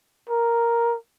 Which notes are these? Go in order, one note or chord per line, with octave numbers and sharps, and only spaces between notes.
A#4